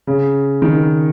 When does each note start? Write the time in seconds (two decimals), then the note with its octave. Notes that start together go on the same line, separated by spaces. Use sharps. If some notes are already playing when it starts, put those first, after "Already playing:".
0.07 C#3
0.62 D#3